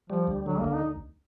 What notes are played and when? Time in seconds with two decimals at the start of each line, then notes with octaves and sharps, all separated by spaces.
0.09 F3 G3
0.27 D2
0.46 D3 F#3
0.59 D2 A#3
0.74 D#4